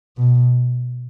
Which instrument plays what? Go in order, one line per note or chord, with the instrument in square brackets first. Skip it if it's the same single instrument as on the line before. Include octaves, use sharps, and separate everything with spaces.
[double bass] B2